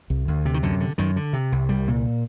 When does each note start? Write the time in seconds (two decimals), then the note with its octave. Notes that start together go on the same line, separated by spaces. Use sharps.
0.10 C2
0.28 D2
0.45 C3
0.54 D#3
0.63 F#2 D3
0.80 D3
0.98 F#2 D#3
1.16 D3
1.33 C3
1.52 C2
1.69 C2 G3
1.88 A#2